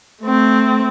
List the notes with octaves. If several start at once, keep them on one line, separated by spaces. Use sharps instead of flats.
A3 C4